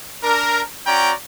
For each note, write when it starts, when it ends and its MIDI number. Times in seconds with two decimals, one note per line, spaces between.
0.23 0.62 62
0.23 0.62 70
0.87 1.13 61
0.87 1.13 66
0.87 1.13 74
0.87 1.13 79
0.87 1.13 82